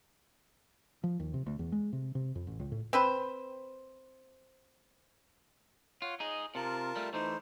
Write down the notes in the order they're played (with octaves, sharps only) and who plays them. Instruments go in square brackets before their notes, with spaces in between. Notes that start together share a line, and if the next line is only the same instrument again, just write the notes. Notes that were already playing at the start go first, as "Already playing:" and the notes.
[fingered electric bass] F3
D#2
C3
D2
E2
G#3
C3
C3
F2
A1
C#2
A2
[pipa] C4 B4 C5
[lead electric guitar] F4 [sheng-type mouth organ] C#5 F#5
[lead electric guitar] D#4 G#4 [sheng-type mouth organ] D#5
[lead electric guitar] C3 [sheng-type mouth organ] F4 A#4 A5
[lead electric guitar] G3 A3
[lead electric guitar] E3 A3 [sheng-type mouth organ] D#4 C5